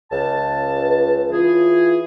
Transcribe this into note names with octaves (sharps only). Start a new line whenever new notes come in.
C#2 A5
B4
E3 F4 G#4